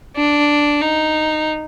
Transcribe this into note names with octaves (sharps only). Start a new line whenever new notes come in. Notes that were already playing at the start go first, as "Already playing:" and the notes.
D4
D#4